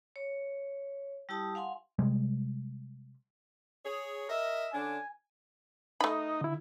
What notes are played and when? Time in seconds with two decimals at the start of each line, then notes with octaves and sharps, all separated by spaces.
0.16 C#5
1.29 G3 E4 G4 A5 D#6
1.55 F5 F#5 G#5 C6
1.99 C3 G3 G#3
3.84 G#4 C#5
4.29 A#4 D#5 E5
4.73 D3 C#4 D4 G#5
6.01 A3 D#4 B5
6.41 D3 E4